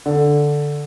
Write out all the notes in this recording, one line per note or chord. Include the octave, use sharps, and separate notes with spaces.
D3